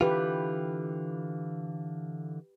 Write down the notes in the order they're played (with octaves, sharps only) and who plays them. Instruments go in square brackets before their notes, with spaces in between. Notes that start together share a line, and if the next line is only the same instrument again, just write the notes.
[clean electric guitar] D3 E3 F4 [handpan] G4 B4